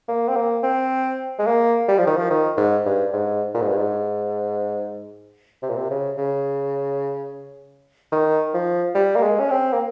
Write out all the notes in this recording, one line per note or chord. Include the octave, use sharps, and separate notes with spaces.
A#3
C4
A#3
C4
G#3
A#3
G3
F3
D#3
F3
D#3
G#2
G2
G#2
A#2
G#2
G2
G#2
C3
A#2
C3
C#3
C#3
D#3
F3
G3
A#3
G#3
C#4
C4
A#3